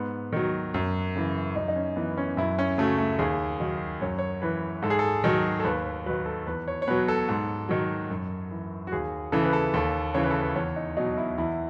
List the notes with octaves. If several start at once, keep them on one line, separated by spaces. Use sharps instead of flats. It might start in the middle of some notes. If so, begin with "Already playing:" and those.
Already playing: G#2 B3
D#3 F#3
F#2
C#3 E3
F#2 D#4
D#4
C#4
E3 B3
C#4
F#2 E4
C#4
C#3 F#3 A3
A3
D#2 G#4
D#3 F#3
F#2 C#5
C#5
E3 B4
G#2 A4
G#4
A4
D#3 F#3
A4
D#2 B4
B4
D#3 F#3 B4
A4
E2 B4
C#5
C#5
B2 F#3 B4
A4
G#2
D#3 F#3
F#2
E3
F#4
D#2 G#4
C#3 E3 A4
B4
A4
D#2 A4
C#3 E3 C#5
B4
A4
B4
E2 C#5
D#4
B2 F#3 D#4
E4
E2 E4